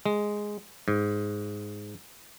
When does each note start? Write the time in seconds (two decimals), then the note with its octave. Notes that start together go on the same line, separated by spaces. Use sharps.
0.06 G#3
0.88 G#2